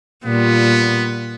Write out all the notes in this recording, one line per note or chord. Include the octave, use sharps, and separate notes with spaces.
A#2 G3 B3 F4